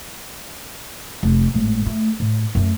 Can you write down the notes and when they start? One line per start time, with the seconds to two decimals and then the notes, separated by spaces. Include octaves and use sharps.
1.23 F1
1.54 G#1 A2
1.86 A3
2.20 A2
2.55 F#2 A3